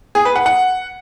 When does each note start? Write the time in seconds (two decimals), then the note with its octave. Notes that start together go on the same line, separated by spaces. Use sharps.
0.15 G#4
0.25 B4
0.36 F#5
0.46 F#5